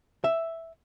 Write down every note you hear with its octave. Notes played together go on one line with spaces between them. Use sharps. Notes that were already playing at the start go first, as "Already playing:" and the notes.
E5